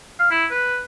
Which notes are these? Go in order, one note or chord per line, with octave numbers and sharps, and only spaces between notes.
F5
E4
B4